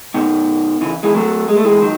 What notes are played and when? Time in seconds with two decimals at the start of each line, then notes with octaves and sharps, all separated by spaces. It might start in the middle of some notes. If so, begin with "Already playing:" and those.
0.14 B2 D#3
0.81 C#3 E3
1.03 E3 G#3
1.14 F#3 A3
1.48 G#3
1.57 A3
1.64 E3 G#3
1.81 D#3 F#3